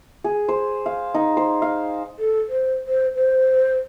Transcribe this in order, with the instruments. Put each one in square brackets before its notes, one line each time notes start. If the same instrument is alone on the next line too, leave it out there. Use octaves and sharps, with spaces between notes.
[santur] G#4
C5
F5
D#4
C5
F5
[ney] A4
C5
C5
C5